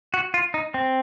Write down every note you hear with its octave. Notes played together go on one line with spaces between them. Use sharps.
F#4
F4
D#4
C4